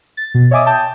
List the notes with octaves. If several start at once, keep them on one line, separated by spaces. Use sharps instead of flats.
A6
B2
C#5 D#5 E5 G#5 D6 D#6
G5 A5 G6